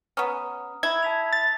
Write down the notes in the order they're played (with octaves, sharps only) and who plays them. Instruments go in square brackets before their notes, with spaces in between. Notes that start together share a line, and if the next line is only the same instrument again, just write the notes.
[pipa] B3 C#4 [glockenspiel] A#5 D#6 F6
[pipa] E4 [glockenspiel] E6 [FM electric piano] G#6
[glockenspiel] A5 B6 F7
[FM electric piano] A6